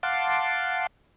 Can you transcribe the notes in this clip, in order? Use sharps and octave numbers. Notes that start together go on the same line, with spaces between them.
F5 F#5 A5 C6 D6